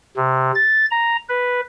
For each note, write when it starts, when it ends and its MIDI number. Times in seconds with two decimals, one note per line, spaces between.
0.16 0.52 48
0.55 0.85 93
0.91 1.16 82
1.29 1.61 71